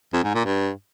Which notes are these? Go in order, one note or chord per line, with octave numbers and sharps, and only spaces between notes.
F2
G#2
A#2
G2